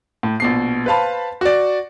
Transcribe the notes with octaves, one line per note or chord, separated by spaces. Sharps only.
A2
A#1 B2 C7
B4 C5 F5 A5 B5
F#4 D5